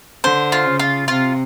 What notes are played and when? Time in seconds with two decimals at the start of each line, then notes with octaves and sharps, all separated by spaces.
0.24 D3 C5
0.52 F4
0.66 C#3
0.79 F4
1.08 C3 F4